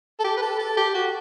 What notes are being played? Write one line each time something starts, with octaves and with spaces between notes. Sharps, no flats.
A4
G4
B4
A4
A4
G4
F#4